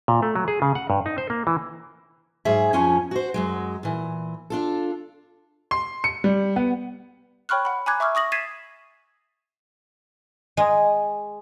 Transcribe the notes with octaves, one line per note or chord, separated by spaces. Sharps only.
A#2
A3
F#3
G#4
C#3
F#5
G2
D#4
C5
A#3
E3
G#2 F#3 G#4 E5
F2 F3 C#4 F4 G#5
F#4 C5
F#2 F#3 G#3
A#2 E3
D4 F4 A4
C6
C#7
G3
B3
C#5 G5 B5 C#6 F6 F#6
F#5 B5
G#5 A#5 B5 D6 F#6 G#6
E5 C#6 D6 E6 F6
C#6 D#6 A#6 F#7
G#6 A6 B6 C7 D#7 E7
G#3